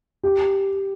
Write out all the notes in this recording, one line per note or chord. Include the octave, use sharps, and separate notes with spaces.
G4